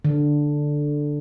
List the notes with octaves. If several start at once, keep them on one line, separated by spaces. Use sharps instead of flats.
D3